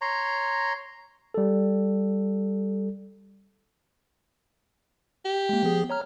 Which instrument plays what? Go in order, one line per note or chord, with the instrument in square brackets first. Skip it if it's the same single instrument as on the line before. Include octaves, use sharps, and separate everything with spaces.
[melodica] C#5 A#5 C6
[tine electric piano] G3 A4
[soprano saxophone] G4
[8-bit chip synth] G#3 A#3
F3 B3 G#4
C#5 A#5 F6